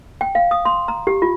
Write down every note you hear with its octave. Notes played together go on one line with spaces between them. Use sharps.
G5
F5
D#6
C6
A#5
G4
F4